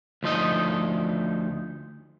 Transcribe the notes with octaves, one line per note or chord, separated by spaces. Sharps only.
D2 F3 D#4 D#5